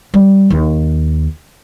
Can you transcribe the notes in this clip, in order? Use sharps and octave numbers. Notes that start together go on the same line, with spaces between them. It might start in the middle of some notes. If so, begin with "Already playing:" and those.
G3
D#2